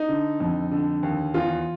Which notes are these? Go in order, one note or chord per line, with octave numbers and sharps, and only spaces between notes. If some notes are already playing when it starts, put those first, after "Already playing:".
Already playing: D#4
D3
F2
D3
D#2
E2 F4